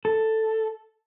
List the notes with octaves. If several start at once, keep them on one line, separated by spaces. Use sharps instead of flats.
A4